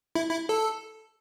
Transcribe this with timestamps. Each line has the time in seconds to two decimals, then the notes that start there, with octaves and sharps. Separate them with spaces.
0.15 E4
0.30 E4
0.49 A4